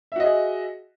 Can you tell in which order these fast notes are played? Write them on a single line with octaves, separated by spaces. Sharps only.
E5 F#4 D#5 G#4